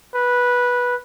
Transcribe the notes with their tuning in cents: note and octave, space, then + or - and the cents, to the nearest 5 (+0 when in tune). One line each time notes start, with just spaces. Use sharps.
B4 -10